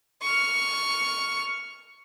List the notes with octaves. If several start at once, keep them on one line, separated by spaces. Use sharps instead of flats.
C#6 F6